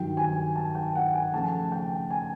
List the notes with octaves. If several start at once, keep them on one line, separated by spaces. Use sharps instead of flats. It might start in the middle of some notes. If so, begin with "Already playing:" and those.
Already playing: G2 D#3 F#3 G5
G#5
A5
G5
F#5
G#5
C#3 F3 A3 A5
G5
G#5